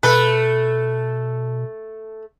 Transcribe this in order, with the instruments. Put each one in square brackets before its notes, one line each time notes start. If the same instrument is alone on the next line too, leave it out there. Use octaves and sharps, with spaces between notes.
[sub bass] B2 [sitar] A3 A4 [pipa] B4